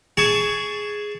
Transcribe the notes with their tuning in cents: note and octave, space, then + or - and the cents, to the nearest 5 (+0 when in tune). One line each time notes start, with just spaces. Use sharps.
G#4 +0 A5 +0 C#6 +20